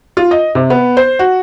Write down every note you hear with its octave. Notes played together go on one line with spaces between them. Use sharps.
F4
D#5
C3
B3
C5
F#4